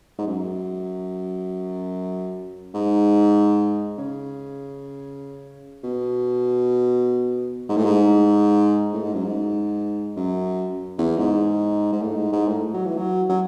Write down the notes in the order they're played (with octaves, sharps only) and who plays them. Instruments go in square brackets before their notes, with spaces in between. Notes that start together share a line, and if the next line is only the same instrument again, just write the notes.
[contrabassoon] G#2
F#2
G#2
C#3
B2
G#2
A2
G#2
A2
G#2
F#2
G#2
F#2
E2
G#2
G#2
A2
G#2
G#2
A2
F#3
E3
F#3
F#3